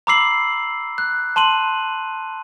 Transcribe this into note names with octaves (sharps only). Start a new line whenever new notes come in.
A#5 B5 D6 E6 C7 F#7
F#6
A5 C6 D#7 F#7